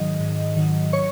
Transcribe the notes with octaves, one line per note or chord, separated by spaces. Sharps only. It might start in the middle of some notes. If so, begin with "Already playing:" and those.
Already playing: G#2 D#3 F#3 D#5
G#2
D#3 F#3
C#5 C#6